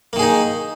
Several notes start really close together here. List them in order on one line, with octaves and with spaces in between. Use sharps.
A#3 D#3 G#4 D#4